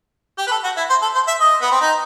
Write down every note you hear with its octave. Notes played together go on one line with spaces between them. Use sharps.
G4
B4
A4
F#4
E4
C5
A4
C5
E5
D#5
B3
C4
D#4